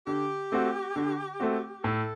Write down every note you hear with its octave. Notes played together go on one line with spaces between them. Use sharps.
D3 G4
A3 C4 F#4
D3
A3 C4 F#4
A2 A4